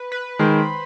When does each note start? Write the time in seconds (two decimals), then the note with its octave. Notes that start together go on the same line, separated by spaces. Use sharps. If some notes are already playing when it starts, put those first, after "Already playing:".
Already playing: B4
0.12 B4
0.39 D#3 G#3 C5